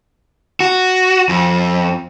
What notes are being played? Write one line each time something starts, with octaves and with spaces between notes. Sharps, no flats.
F#4
F2